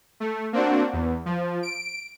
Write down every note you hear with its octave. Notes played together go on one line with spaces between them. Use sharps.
A3
A#3 C4 D4 F#4
E2
F3
D7